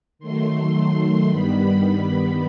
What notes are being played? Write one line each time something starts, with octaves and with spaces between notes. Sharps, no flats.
D#3 F#3 A3 C6
G2 D#3 G3 B3 B5